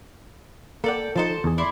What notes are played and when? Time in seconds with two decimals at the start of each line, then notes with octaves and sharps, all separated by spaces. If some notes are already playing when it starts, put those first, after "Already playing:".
0.84 A#3 A4 D5 F#5 G5
1.16 F3 D#4 A4 C5 A5
1.44 E2 G#4
1.58 E4 D5 C6